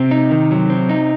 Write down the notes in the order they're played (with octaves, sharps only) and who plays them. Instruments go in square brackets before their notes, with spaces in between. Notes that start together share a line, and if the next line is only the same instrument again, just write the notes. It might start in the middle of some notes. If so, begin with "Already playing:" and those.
Already playing: [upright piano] C3 [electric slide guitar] C4
[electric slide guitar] D#4
D#3
F#3
C4
D#4